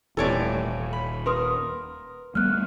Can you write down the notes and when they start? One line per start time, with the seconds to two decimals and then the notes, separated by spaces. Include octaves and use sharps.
0.17 D#1 A2 C3 E3 A4 C#5 D5
0.93 B5
1.26 A#4 B4 C6 D#6
2.35 G3 A3 B3 F6 F#6